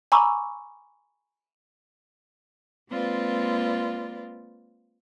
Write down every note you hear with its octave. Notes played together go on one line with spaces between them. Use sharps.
G#5 A#5 B5 C#6 D6 E6
G#3 A#3 C4 F4 B4 D5